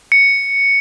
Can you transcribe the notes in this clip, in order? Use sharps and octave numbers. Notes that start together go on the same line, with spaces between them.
C#7